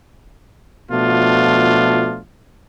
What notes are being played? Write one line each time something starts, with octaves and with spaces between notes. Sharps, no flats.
B2 F3 A3 D4 F4